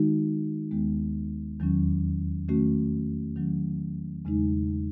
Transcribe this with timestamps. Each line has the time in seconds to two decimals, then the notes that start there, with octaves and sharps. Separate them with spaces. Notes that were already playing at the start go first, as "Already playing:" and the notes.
Already playing: D#3 G#3 D#4 F#4
0.71 D#2 D#3 G#3 B3
1.60 E2 D#3 F#3 C#4
2.48 D#3 A3 C#4 F#4
3.36 D#3 F#3 C#4
4.25 E2 C#3 G#3 D#4